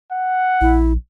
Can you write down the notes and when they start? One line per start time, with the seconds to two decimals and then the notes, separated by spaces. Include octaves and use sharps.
0.12 F#5
0.61 A#1 E4